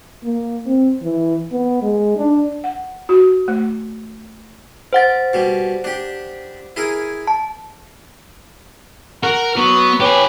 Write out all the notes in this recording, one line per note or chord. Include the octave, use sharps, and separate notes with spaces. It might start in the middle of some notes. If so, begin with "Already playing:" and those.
A#3
C4
E3
B3
G#3
D4
F#5
F#4
A3
C5 F#5 A6
B2 G3
D4 G4
E4 G#4 A#4
A5
A#4 F#5
F#3 B3
G4 B4 C#5 G#5